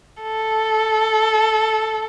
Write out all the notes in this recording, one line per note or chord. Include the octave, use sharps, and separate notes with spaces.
A4